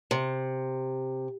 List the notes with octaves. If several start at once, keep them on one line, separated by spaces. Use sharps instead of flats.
C3